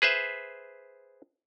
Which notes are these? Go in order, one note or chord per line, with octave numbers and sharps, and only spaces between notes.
G#4 B4 C5 E5